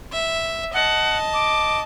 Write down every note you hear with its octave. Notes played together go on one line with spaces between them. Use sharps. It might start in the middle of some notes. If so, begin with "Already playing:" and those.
E5
D#5 F#5 A5
D6